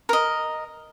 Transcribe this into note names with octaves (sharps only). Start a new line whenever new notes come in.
A#4 D#5